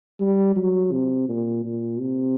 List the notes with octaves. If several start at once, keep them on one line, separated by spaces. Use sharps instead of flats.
G3
F#3
C3
A#2
A#2
C3